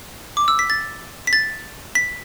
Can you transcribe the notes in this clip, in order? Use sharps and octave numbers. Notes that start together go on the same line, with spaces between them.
D6
E6
B6
A6
B6
A6
B6